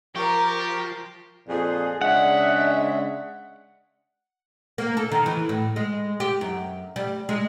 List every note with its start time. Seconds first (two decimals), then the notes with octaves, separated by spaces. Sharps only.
0.15 F3 G4 A#4 C#6
1.48 F2 A#2 G#4
2.01 C#3 G#3 D4 E5 F#5
4.78 A#3
4.97 A4
5.12 D#3
5.26 E3
5.49 A2
5.76 G#3
6.20 G4
6.41 F#2
6.96 G3
7.29 G#3